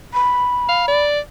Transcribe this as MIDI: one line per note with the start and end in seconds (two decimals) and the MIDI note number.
0.14 1.01 83
0.69 0.86 77
0.88 1.20 74